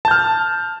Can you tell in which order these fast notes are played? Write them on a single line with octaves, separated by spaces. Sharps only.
A5 G6 F6